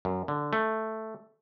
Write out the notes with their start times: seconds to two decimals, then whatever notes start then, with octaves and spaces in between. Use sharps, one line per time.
0.05 F#2
0.28 D3
0.53 A3